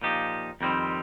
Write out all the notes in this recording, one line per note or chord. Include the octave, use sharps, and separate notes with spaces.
A#2 F3 D#4 G4
F2 D#3 G3 C4